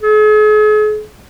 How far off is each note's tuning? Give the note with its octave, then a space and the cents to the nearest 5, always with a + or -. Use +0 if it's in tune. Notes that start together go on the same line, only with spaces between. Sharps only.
G#4 +45